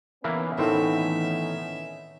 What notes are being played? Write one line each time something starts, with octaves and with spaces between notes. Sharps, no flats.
E3 A#3 B3 C#4 D#4 E4
A2 D#3 E3 A3 C4 E5